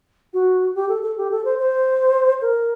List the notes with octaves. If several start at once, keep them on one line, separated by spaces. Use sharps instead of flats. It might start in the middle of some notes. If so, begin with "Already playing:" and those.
F#4
G4
A4
A4
G4
A4
C5
C5
A#4